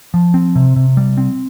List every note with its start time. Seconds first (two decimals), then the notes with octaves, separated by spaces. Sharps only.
0.14 F3
0.34 C4
0.56 C3
0.76 C3
0.97 G3
1.17 C4